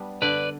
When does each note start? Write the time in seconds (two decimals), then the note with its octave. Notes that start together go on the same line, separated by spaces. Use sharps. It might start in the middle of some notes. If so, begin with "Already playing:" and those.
Already playing: G3 B3 D4
0.22 D3 B4 D5